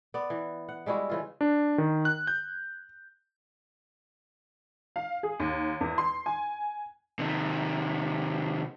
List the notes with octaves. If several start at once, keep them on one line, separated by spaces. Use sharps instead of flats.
B3 D5
E3
F#5
G3 G#3 E4 F#4
C#3 E3 F4
D4
D#3
F#6
G6
F5
G#4
D#2
E2
C6
G#5
C3 D#3